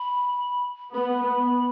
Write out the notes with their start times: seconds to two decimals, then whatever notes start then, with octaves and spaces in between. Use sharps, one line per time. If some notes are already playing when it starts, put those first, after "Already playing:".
Already playing: B5
0.94 B3 B5